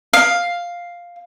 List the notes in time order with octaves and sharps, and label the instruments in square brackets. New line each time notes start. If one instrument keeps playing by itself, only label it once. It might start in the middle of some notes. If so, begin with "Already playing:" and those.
[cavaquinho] F5